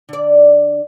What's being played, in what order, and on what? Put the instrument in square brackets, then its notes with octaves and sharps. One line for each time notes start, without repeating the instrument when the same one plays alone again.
[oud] D3 D5